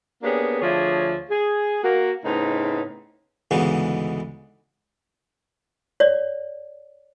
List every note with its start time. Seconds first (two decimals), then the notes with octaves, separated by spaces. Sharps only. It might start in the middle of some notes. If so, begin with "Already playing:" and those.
0.23 A#3 B3 C#4 D4 G4 G#4
0.62 D2 F3 D4 G#4 C#5 E5
1.30 G#4
1.83 A#3 F#4
2.25 A2 C#3 B3 C4 D#4
3.51 D2 G#2 C#3 E3 G#3 B3
6.00 C#5 D5